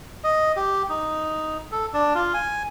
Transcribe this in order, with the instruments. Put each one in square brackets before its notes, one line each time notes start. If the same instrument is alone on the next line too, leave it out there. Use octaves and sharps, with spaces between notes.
[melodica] D#5
G4
D#4
A4
D4
F4
G#5